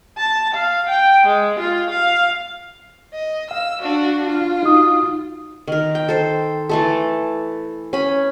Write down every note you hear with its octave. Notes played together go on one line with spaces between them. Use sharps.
A5
F5
G5
G#3
F4
F5
D#5
F5 E6
D4 F#4
F4
D#4 F#4 D#6
D#3 A#4
G5
A4 C5
E3 A3 A4
C#4 B5